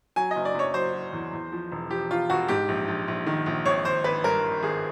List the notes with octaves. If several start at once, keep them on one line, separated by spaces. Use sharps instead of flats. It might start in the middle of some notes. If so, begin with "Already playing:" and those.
F#3 G#5
D#5
F#1
D5
F#1 C#5
F#3 C5
F#3
E2
E2
F3
E1
F3 G4
E1 F4
E1 F#4
G#2 G4
A#1
A#1
A#1
D#3
A#1
G#1 C#5
G#1 C5
G#1 B4
G2 A#4
G#1
G#1 G#4